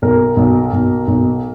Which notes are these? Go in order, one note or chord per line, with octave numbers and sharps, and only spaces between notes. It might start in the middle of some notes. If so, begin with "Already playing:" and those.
B1 A#4
B1
B1
B1